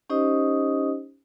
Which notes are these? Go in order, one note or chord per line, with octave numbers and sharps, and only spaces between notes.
C#4 D#4 G4 C5 D#5 D#6